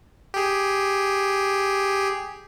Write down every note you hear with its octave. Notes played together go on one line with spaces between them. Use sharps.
G4 G#4